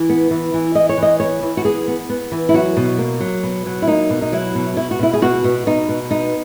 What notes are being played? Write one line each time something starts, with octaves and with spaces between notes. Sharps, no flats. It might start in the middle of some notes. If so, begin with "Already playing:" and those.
Already playing: E3
B3
E3
E3
B3 D#5
C#5
E3 D#5
B3 C#5
E3
F#4
B3 G#4
B3
B3
E3
E4
F#3 F#4
B2
A#3
F#3
B2
F#3
E4
A#3 D#4
B2
D#4
F#3 E4
B2
B2 E4
F#4
B2 E4
G#4
B2 F#4
B2
B2 D#4
B2
B3 D#4